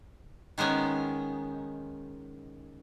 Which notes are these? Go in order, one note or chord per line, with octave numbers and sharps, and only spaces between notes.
D#3 G#3 B3 C#4 D#4